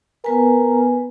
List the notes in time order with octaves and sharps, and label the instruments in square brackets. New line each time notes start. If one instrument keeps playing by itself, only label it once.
[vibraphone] B3 B4 G#5 [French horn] A#4